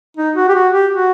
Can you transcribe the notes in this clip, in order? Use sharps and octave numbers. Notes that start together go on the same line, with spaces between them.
D#4
F#4
G4
F#4
G4
F#4